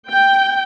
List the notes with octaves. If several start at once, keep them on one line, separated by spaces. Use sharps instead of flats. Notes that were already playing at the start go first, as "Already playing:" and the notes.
G5